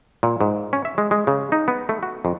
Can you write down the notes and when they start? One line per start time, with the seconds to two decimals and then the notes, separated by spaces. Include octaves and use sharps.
0.23 A#2
0.41 G#2
0.73 C#4
0.85 E5
0.98 G#3
1.11 G#3
1.27 C#3
1.52 D#4
1.68 B3
1.89 A3
2.03 F#4
2.25 F2